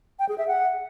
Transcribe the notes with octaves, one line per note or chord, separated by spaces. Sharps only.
G5
G#4
E5
F#5